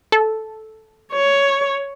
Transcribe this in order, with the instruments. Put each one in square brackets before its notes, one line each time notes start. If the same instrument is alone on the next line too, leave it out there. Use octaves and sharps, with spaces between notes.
[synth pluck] A4
[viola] C#5